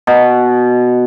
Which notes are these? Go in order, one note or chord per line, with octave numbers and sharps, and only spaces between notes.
B2